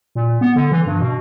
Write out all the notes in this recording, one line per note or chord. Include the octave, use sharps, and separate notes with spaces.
A#2
B3
D3
E3
G2
B2